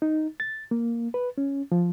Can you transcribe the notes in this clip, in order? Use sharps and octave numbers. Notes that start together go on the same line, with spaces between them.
D#4
A6
A#3
B4
C#4
F3